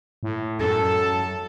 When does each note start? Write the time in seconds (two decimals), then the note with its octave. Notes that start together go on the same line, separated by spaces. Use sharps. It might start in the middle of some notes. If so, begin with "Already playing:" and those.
0.23 A2
0.60 F#2 A4